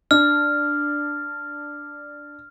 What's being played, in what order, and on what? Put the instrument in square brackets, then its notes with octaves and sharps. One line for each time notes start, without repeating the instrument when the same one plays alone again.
[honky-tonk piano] D4 [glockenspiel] F6